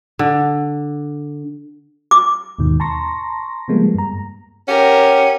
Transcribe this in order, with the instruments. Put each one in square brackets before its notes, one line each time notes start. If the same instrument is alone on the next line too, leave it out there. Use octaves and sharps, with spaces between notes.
[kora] D3
[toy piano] D6
[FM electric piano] D#2 G#2 B2 D#3
A5 A#5 C6 C#6 A#6
C#3 F3 G3 G#3 A#3 B3
G2 A#5
[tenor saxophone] C#4 [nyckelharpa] G4 A#4 [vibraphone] F#5 G5